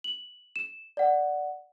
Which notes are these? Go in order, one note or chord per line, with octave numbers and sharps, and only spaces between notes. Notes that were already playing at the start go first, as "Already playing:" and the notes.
F#7
E7
D5 F#5